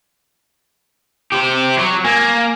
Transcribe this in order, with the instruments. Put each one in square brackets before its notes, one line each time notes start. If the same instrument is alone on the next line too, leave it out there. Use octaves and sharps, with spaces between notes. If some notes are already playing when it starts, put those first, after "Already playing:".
[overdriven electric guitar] G4 C5
F#3
[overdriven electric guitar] A#3 [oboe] G#5